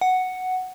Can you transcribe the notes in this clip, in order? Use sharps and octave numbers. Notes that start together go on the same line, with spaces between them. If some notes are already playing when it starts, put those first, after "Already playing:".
F#5